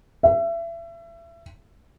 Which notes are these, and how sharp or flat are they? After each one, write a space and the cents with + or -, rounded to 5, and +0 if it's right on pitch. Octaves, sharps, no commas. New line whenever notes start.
E5 +30